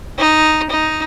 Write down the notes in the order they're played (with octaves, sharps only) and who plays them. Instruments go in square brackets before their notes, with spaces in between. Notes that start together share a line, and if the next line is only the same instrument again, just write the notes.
[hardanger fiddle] D#4
D#4